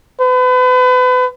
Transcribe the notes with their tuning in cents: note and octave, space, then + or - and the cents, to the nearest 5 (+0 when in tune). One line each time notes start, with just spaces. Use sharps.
B4 +35